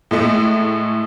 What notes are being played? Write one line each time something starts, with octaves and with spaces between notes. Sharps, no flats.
A2 G#3 A3